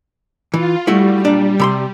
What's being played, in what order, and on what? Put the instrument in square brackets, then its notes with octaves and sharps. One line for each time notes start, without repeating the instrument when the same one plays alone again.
[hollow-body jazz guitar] E3 [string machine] F4
[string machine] G3 [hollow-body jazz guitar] A3 E4 F#4
[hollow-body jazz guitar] A#2 D4
C3 B5 C6